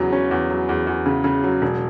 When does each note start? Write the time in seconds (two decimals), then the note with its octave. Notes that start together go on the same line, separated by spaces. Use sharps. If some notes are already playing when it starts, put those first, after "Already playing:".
Already playing: E2 C#3 F#3
0.12 C#4
0.31 E2
0.50 F#3
0.69 E2
0.87 E2
1.06 C#3
1.24 C#3
1.44 F#3
1.62 E1